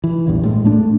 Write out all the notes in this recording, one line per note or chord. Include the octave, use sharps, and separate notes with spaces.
E3
A#1 E2 G2
A2 G#3
A2 A3 D4